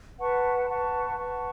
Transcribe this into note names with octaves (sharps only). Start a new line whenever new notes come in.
B4 F#5 A5 C#6
B4 F#5 A5 C#6
B4 F#5 A5 C#6